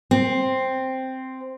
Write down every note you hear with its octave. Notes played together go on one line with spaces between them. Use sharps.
C4